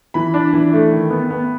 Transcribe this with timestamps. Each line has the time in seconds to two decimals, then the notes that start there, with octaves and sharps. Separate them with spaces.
0.14 E3 B5
0.34 D4
0.53 E3
0.73 A3
0.92 D#3
1.10 B3
1.30 B3